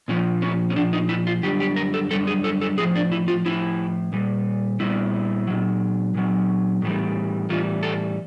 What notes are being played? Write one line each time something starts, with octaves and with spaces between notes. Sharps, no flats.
A#2 F3 C#4
C#4
C#4
A#2 F3 D4
D#4
E4
F4
F#2 D3 G3 G4
G4
A#4
A4
F#2 D3 G3 A4
G#4
A4
A4
A2 F3 G#4
D4
E4
F4
A2 F3 E4
A#2 G3
A#2 G3 E4
A#2 F#3
A#2 F#3
A2 E3 G3
A2 E3 G3 F4
A4